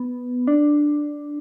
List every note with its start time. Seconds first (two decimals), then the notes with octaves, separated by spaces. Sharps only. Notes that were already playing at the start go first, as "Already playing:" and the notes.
Already playing: B3
0.47 D4